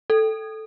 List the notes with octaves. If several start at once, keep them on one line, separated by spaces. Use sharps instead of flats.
A4